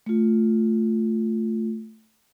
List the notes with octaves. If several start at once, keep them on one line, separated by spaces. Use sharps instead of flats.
A3 F4